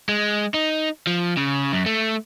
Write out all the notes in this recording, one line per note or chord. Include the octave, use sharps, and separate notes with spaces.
G#3
D#4
F3
C#3
F#2
A3